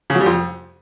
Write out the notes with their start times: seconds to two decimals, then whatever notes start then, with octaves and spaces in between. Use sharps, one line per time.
0.10 C#3
0.15 F#3
0.21 G3
0.26 F2